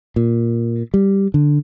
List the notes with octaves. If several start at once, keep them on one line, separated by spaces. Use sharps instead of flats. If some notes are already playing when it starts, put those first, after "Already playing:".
A#2
G3
D3